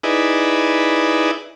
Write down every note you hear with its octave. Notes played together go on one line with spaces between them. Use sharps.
D#4 E4 G#4 B4 D5